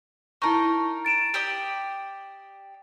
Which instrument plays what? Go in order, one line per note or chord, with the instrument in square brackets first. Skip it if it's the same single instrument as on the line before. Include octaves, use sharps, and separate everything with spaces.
[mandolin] D#4 A#4 [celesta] E4 A5 C#6
[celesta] A6 D7 E7
[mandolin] G4 D5 D#6